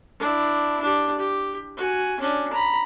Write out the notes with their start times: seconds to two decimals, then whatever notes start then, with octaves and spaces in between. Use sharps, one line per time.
0.20 D4 E4
0.81 D4 G4
1.18 G4
1.77 F#4 G#5
2.20 C#4 D4
2.53 A#5 B5